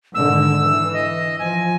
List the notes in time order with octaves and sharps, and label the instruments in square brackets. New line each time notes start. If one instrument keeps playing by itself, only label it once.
[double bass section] G#2 D3 D#3 [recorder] E6
[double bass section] E3
[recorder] D#5
[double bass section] F3 [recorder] G#5